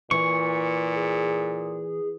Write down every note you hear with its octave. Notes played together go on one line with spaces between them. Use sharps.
A#2 E3 C#6
G#4